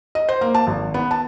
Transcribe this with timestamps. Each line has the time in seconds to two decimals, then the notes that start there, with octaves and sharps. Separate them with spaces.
0.15 D#5
0.29 C5
0.41 A#3
0.54 A5
0.67 G#1
0.94 B3
1.11 A5